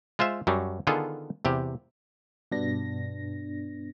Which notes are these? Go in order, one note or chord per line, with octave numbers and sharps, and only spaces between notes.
G#3 F4 C5 E5
F#2 F#3 G3
D3 D#3 B3 F4 G#4 A4
E2 C3 G4
G2 B2 B3 D4 A#6